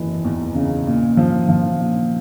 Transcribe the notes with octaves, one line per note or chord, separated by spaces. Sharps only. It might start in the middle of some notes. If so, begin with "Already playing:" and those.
Already playing: F#1 E3
E2
C#3
A#2
F3
F3
A#2